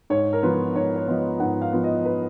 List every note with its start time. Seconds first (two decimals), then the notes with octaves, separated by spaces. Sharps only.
0.10 G#2 C#5
0.33 A#4
0.43 F3 B3 F4 B4
0.76 G#2 C#5
0.96 C#5
1.07 F3 B3 F4 D#5
1.40 G#2 F#5
1.62 F5
1.73 F3 B3 F4
1.84 D#5
2.05 B4